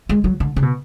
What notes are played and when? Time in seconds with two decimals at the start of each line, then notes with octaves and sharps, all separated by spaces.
0.09 G#3
0.24 F#3
0.40 D3
0.56 C#3
0.62 B2